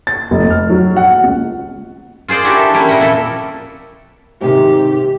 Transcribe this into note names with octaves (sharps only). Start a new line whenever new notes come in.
A6
F1
F6
F#3
F#5
C#2
F4 G#4 C5 D5 D#5
D4 E4 F#4 G4 A#4
A4
G3 A#3 C#4 E4
A#2 A#4 D#5 F#5 B5
F2 E4 A4
G#2 C3 D#3 G4